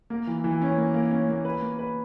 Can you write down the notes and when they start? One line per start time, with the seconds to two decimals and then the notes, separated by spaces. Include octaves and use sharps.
0.10 A#3
0.27 E3
0.44 E3
0.62 C#4
0.78 A#3
0.94 A#3
1.11 C#4
1.29 A#3
1.45 B4
1.62 A#3
1.79 B4